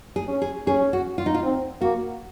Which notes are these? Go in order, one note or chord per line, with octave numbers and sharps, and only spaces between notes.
G#4
C#4
G#4
C#4 G#4
F#4
F4
D#4
F4
C4
A#3 F#4